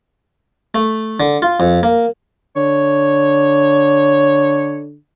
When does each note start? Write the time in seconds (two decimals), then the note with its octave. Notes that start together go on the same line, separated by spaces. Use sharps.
0.75 A3
1.20 D3
1.42 F4
1.60 F2
1.83 A#3
2.56 D3 C#5